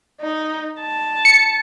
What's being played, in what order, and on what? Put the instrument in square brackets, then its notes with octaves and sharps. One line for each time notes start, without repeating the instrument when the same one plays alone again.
[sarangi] D#4
A5
[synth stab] C#7